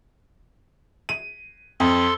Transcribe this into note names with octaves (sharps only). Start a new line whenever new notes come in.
D#7
F2 A4 C6